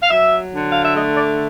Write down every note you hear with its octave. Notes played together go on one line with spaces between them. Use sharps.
F5
F#3 E5
D3
F5
E5
A3 D#5
D5